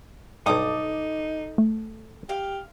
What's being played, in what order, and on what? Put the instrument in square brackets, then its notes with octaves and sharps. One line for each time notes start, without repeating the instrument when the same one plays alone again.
[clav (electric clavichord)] B1 G2 [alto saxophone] D#4 [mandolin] A4 D6 D#6
[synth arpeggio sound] A3
[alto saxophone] G4 [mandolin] F5